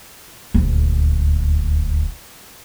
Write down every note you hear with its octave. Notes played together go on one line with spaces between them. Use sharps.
D#1 D2